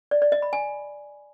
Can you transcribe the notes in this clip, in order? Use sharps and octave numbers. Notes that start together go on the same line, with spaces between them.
D5
D5
D#5
B5
G#5